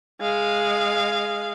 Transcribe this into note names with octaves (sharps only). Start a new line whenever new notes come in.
G#3 F5